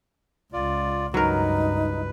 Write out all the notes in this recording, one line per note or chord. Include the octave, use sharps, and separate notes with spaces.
C#2 F4 D5
C#2 G2 F#3 D#4 A#4 B4